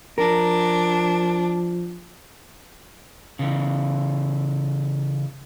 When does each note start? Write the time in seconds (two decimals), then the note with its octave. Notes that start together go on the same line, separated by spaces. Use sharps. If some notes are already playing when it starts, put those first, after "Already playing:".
0.18 F3 D4 A#4
3.39 C#3 E3